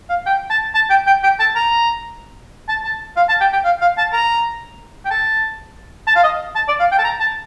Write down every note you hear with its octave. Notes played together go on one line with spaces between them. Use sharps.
F5
G5
A5
A5
G5
G5
G5
A5
A#5
A5
A5
F5
A5
G5
G5
F5
F5
A5
A#5
G5
A5
A5
F5
D#5
A5
D5
F5
G5
A5
A#5
A5